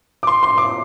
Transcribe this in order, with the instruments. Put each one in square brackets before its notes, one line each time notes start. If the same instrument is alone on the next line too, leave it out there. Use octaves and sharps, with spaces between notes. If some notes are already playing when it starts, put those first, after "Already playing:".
[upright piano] D6
C6
C6
D6